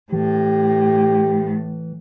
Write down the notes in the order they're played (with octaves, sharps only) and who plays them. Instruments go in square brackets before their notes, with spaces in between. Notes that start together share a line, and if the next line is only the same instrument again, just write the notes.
[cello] A2 [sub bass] E3 [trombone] G4